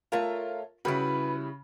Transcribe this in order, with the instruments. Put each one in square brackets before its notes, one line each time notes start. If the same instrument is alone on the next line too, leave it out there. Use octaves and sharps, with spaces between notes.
[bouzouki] A3 C#5 A#5 [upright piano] F4 A#4
[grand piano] C#3 B5 [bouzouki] G3 E4 [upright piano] F#4 [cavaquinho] B4